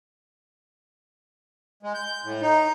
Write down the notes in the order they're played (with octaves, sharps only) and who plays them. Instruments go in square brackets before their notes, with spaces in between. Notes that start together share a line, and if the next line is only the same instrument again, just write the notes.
[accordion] G#3
G6
A2
D#4